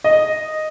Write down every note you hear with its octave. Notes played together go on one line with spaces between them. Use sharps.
D#5